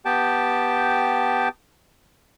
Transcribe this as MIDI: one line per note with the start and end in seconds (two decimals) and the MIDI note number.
0.05 1.49 59
0.05 1.49 67
0.05 1.49 79
0.05 1.49 81